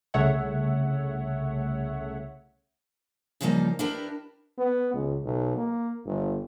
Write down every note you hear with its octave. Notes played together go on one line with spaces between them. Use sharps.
C2 C#3 A3 C#5 E5 F#5
C#3 E3 F3 G3 A#3 D#4
D4 E4 G4 A#4 B4
B3
C#2
B1
A#3
G1